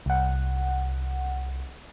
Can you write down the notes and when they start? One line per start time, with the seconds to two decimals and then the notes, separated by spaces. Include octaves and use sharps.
0.06 C2 F#5